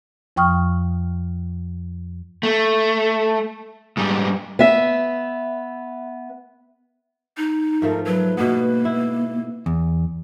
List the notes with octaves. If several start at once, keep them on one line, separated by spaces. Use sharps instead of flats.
F2 F3 G5 C#6 D#6 F6
A3
G#2 G3
B3 E5
D#4
G#2 F3 A3 A#4
F#3 B4
B2 A#3 B3
E4
E2